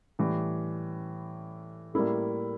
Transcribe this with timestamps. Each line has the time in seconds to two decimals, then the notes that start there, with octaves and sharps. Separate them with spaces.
0.19 A2 E3 G3
1.94 A2 G3 A#3 E4 A4